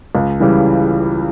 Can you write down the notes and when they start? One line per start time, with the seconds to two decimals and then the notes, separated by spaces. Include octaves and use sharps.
0.15 C#2
0.40 C#3 E3 G3